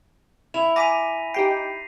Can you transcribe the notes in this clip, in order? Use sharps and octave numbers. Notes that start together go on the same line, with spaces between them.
E4 F7
G#5 A#5 D6 A#6 B6 D#7
D#4 G4 G5 C7